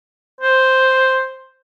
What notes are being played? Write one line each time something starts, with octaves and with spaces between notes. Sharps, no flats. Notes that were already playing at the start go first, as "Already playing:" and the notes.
C5